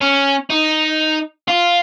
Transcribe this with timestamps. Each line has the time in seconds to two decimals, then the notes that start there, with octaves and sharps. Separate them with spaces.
0.01 C#4
0.50 D#4
1.48 F4